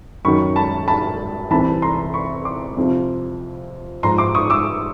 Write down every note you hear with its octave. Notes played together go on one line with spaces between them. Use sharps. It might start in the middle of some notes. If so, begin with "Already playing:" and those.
F#2 D#3 F#3 B5 C#6
A5 B5
A5 B5
C2 C3 E3 A5 B5
A#5 C6
B5 C#6
C6 D6
F2 C3 F3
G#2 F3 A#5 C6
C6 D6
C#6 D#6
D6 E6